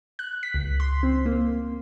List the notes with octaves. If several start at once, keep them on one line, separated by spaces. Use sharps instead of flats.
F#6
B6
C#2
C6
C4
A#3